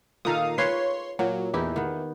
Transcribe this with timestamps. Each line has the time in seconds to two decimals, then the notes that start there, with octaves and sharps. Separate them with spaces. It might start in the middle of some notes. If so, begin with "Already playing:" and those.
0.25 A#2 D#3 A4 F5 A#5 D#6
0.58 F4 G#4 B4 C#5 C6 C7
1.19 A#2 F#3
1.54 E2 E3 D#4 E4 G4
1.76 D#3 B3